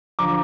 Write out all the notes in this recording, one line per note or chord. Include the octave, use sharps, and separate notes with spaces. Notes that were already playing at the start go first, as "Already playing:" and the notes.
D3 F3 A#5 D6